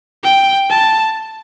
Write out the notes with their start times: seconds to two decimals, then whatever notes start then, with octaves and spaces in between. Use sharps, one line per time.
0.23 G5
0.70 A5